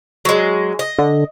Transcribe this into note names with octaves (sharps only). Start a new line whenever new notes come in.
F#3 G#3
D#5
D3